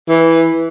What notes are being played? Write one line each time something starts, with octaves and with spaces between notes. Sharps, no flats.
E3